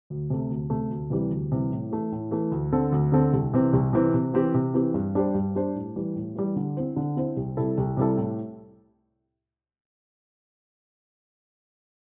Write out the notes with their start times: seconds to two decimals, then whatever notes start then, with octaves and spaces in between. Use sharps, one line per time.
0.10 D2
0.30 C3 A3
0.50 D2
0.70 C3 A3
0.90 D2
1.10 C3 E3 G3
1.31 D2
1.52 C3 E3 G3
1.72 A2
1.91 E3 A3
2.12 A2
2.31 E3 A3
2.52 D2
2.72 D3 C4 A4
2.92 D2
3.12 D3 C4 A4
3.33 C2
3.53 C3 E3 C4
3.73 C2
3.93 C3 E3 C4
4.14 C3
4.33 E3 C4 G4
4.54 C3
4.74 E3 C4 G4
4.94 G2
5.15 G3 D4 G4 C5
5.34 G2
5.55 G3 D4 G4 C5
5.75 A2
5.96 E3 G3
6.16 A2
6.35 E3 G3
6.56 D3
6.77 C4 E4 C5
6.97 D3
7.16 C4 E4 C5
7.37 C2
7.57 C3 G3 E4 A4
7.78 C2
7.97 C3 G3 E4 A4
8.17 A2